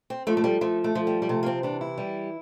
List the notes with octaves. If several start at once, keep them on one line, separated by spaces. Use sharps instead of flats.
C4
F3 A3
A3
G3
F3 A3
A3
F3
G3
G3
C3 A3
A#3
C4
E3 D4
E4
G3